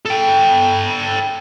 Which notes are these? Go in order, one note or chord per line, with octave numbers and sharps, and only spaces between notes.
A4 G5